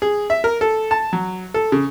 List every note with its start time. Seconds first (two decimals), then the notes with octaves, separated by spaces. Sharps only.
0.02 G#4
0.30 E5
0.44 A#4
0.61 A4
0.91 A5
1.13 F#3
1.54 A4
1.72 C#3